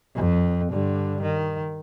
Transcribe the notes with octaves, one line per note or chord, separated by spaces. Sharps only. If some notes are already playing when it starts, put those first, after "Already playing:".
F2
G2 D3
D#3